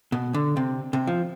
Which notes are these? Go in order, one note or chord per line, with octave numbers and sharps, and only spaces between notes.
B2
D3
C3
C3
F3